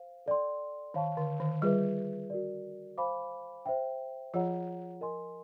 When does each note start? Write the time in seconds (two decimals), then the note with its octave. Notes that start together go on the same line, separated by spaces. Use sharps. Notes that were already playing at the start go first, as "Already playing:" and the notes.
Already playing: C5 F5
0.26 A4 D5 G5 C6
0.94 D#3 C#5 F5 A5 C#6
1.17 D3
1.40 D#3
1.62 G3 F4 G#4 B4 E5
2.30 F#4 A#4 D5
2.97 C5 F5 G#5 B5 D6
3.66 C5 E5 G5
4.34 F3 F4 G#4 C#5 F#5 A#5
5.01 A#4 D#5 G#5 C6